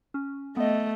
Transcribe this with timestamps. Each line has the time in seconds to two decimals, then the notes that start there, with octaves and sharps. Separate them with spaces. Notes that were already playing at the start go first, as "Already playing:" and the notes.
0.14 C#4
0.57 A3 B3 D#5